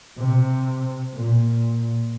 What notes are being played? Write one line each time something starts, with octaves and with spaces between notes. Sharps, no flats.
C3
A#2